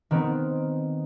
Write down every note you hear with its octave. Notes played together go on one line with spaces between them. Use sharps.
D#3 B3 C4